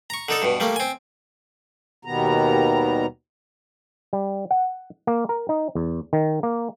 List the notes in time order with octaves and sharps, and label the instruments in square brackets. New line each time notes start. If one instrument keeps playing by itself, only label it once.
[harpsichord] A#5 C#6
D3 D#4 A4
G2 B2
G3 A3 A#3
C4 G#5
[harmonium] D#2 B2 D#3 G3 B3 A#5
[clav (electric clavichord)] G3
F#5
A#3
A#4
D#4
E2
D#3
A#3